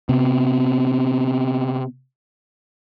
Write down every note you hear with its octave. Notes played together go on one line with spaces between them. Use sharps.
C3 B3